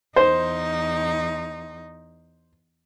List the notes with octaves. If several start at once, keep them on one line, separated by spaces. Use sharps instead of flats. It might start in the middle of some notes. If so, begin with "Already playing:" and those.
E2 D#4 C5